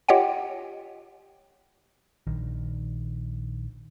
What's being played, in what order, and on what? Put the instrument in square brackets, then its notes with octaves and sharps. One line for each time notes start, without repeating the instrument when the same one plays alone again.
[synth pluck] F4 G4 C#5 D#5 F#5 G5
[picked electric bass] A#1 D#3